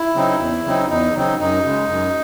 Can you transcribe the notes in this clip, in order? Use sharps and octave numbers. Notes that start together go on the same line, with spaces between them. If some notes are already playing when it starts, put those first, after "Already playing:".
Already playing: E4
C#3 F#3 C4 D#4
E2
C#3 F#3 C4 D#4
E2 D#4
C#3 F#3 C4 D#4
F#2 D#4
C#3 G#3
F#2